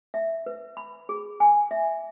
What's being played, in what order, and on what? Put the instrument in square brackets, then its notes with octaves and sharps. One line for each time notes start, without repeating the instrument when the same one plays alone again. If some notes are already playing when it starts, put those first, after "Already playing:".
[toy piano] E5
B4
B5
G#4
G#5
E5